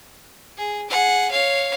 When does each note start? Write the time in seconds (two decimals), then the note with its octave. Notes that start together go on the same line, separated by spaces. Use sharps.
0.57 G#4
0.89 G#4 F#5
1.30 C#5 F5